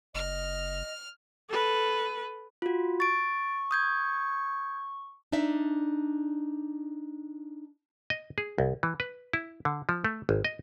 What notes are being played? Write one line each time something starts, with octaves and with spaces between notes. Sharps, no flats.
F#1 D#5 F6
A4 B4
F4 F#4
C#6 A6 D7
D#6 G6 G#6
D4 D#4 D5 E5
D#5
G#4
C2
E3
B4
E4
D3
F3
A3
G#1
D#5